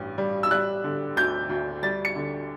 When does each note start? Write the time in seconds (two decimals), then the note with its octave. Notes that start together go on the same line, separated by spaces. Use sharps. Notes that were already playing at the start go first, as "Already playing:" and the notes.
Already playing: A1 G2
0.18 G3
0.43 E6
0.51 G3 F#6
0.84 D3
1.16 D2 G6
1.49 D2
1.83 G3 A6
2.05 C#7
2.16 D3